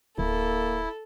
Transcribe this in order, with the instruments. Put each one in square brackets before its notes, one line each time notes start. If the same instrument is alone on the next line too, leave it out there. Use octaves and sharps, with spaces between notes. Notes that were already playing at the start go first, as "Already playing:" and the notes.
[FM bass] D1 [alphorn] A#3 [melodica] E4 [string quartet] A4